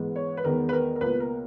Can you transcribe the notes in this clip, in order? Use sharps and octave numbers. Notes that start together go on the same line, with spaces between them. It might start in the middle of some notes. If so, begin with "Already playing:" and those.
Already playing: G#2 E3 G#3 B3
C#5
B4
E2 D#3 G#3 B3 A#4
B4
A#4
A#4
C#2 B2 A#3 B4
A#4